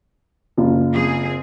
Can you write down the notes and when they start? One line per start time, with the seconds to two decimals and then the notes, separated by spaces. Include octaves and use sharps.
0.57 F#1 F4
0.93 C4 G#4